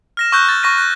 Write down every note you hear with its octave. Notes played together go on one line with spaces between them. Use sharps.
F6 A#6 E7
C#6 E6 F#6 G6
A6
C#6 A#6 D#7
F#6